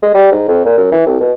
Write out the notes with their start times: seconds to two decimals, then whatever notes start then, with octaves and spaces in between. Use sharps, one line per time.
0.03 G#3
0.14 G3
0.32 G#2
0.48 F2
0.65 A#2
0.77 F#2
0.92 E3
1.07 C2
1.20 B2